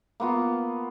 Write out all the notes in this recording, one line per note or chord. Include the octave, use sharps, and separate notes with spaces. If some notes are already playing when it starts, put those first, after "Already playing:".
A#3 B3 F4